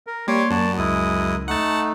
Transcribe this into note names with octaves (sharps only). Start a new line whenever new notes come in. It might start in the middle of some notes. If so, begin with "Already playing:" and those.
A#4
G3 A#3 C#5 C6 D6
F#2 F#4 D5 A5
C#2 G#3 E4 D#6
A3 D#4 F#5 A5